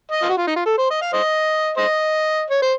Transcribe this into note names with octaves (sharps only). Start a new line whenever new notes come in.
D#5
F4
F#4
F4
D#4
F4
A4
C5
D#5
F5
C5 D#5
C5 D#5
C#5
C5